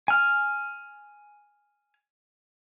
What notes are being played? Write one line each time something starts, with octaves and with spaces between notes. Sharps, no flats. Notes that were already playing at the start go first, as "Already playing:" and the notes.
G#5 F6